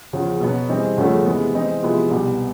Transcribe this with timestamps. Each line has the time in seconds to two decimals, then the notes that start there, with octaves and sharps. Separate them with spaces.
0.13 E2 C#3 F3
0.40 B2 F#3 B3
0.69 E3 G3 C4 D#4 G#4
0.97 E2 C#3 F3 A3 C#4
1.25 C3 E3 G#3 B3
1.54 E3 G#3 C4 D#4
1.83 C3 F3 G#3 B3 E4
2.11 C2 B2 G3 B3